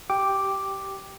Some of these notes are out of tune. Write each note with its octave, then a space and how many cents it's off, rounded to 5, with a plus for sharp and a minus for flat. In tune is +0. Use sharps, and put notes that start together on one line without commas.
G4 -15 G5 +0 D6 +0